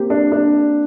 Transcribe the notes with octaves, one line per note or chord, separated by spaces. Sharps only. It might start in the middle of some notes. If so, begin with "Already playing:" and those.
Already playing: A#3 C4 G4
D4
D4